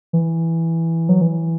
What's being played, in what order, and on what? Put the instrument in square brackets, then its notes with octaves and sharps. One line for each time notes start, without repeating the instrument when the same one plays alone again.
[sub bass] E3
F#3
E3